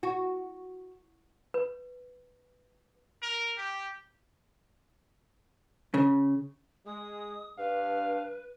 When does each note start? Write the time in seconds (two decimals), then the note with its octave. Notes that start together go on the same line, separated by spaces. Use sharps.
0.03 F#4
1.54 B4
3.22 A#4
3.58 G4
5.94 C#3
6.86 G#3 D#6
7.58 G2 B4 F5